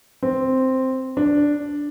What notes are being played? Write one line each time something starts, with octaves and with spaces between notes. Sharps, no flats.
C4
D4